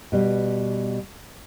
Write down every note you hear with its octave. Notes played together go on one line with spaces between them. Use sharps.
B2 G3